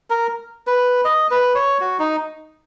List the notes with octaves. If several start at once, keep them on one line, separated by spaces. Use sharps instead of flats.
A#4
B4
D#5
B4
C#5
F#4
D#4